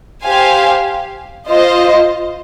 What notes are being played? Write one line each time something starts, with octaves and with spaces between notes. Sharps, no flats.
G4 C5 F5 G#5
F4 C5 D#5